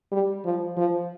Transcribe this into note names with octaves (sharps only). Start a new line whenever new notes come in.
G3
F3
F3